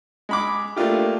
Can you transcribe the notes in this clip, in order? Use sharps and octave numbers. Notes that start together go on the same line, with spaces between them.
G#3 B5 D6
A3 A#3 D4 F4 G4